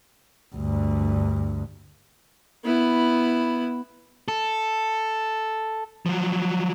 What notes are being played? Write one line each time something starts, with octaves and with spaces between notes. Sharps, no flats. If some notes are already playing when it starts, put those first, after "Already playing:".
D2 G2
B3 E4
A4
F3 F#3